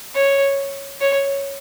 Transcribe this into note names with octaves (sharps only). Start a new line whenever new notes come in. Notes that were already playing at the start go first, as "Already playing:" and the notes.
C#5
C#5